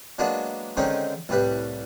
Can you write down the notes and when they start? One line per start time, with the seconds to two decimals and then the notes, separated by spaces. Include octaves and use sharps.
0.19 F#3 G#3 A#3 B3 D4
0.77 D3 D#3 G#3 C4 C#4 D#4
1.29 C2 A2 G3 B4